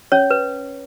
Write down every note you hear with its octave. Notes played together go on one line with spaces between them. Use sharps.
C#4 C#5
B4